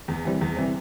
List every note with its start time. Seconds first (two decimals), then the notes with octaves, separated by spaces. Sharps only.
0.08 E2
0.25 C3 E3 G3 C4
0.41 E2
0.57 C3 E3 G3 C4